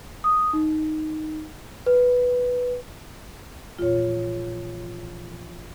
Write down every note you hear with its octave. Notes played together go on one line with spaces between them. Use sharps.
D#6
D#4
B4
A#1 E2 F4 C#5